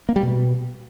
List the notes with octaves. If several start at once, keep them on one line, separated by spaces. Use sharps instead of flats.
A#3
G3
B2